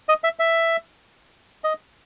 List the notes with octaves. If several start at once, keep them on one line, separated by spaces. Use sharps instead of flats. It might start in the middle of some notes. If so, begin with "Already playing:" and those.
D#5
E5
E5
D#5